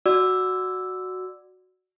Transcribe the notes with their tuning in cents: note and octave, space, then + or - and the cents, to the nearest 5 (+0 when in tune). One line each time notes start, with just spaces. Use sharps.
F#4 +0 D5 +10 E6 +0